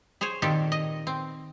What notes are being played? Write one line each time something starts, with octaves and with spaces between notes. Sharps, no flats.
G#4 C5 C#5 G#5
A#2 D#3 C4 G4 A4
D#5
C4